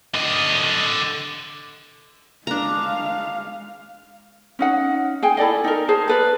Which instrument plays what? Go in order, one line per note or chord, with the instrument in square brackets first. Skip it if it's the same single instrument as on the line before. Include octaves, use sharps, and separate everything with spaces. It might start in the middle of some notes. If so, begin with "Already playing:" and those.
[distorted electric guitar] D3 D#5
[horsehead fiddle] G#3 F5 [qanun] D4 A#5
[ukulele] C#4 D#4 F#5
G#4 G5 G#5
E4 A4 D5 D#5
D#4 A#4
G#4 C5 A5
A4 B4 D5